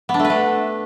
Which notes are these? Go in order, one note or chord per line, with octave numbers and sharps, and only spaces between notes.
B3
D4
A3
B4
A3